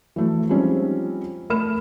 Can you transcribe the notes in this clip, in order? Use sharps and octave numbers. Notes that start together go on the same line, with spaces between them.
E3 F#3 A3
F3 G3 G#3 C4 C#4 D#4
A3 A#4 B5 F6 E7